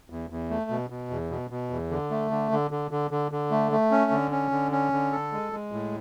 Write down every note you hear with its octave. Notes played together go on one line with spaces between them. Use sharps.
E2
E2
A3
B2
B2
E2
B2
B2
E2
D3
A3
D3
D3
D3
D3
D3
D3
A3
A3
C#4
D3
C#4
D3
C#4
D3
A4
G#3
G#3
A2